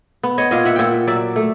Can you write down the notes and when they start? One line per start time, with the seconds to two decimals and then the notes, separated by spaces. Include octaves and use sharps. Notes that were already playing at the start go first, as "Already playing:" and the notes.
0.23 B3
0.38 C#5 D#5
0.51 A#2 D#5 F5
0.65 E5 F#5
0.76 A#2 E5 F#5 G5
1.07 F#3 D5 E5
1.36 A3